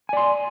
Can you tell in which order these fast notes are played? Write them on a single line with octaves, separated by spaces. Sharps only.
G#5 D5 C6